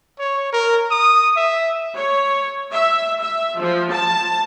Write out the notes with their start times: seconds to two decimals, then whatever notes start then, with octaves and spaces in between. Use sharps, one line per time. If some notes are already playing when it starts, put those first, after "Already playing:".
0.19 C#5
0.52 A#4
0.91 D#6
1.36 E5
1.94 C#5
2.73 E5
3.19 E5
3.56 F3
3.91 A5